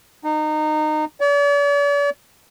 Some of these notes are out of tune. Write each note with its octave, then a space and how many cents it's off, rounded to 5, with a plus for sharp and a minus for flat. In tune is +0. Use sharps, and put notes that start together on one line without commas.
D#4 -25
D5 -45